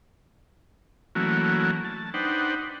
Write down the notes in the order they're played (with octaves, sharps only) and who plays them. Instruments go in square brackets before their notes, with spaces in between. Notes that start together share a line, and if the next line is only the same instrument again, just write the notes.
[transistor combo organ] E3 F#3 A3 A#3 C#4 F#4
A5
D4 D#4 B4 C5 F#5 G5